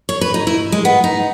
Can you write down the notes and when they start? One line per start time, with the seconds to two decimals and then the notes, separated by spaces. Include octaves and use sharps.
0.09 C#5
0.21 B4
0.34 D#4
0.47 E4
0.72 G#3
0.85 B3
1.04 D#4